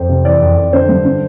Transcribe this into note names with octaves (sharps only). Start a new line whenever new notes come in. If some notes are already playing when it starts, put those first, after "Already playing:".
Already playing: F2 C5
C3
E3 D5
F2
F2
D3 C5
G2
D3